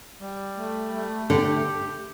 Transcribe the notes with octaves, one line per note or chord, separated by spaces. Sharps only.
G3
A3
A3
D3 G4